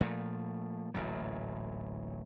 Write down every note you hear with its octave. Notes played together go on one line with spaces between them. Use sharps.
A#2 F3 A3
D1 A1 A#2 F#3